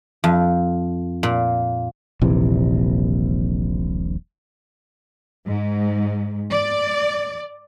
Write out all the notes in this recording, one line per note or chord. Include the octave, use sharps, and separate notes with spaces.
F2
A#2
D#1 A#1 C3 E3
G#2
D5